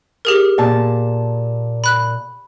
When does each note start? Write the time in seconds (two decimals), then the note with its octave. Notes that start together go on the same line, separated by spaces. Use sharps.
0.25 G4 G#4 A#4
0.58 A#2 A5
1.84 B5 F#6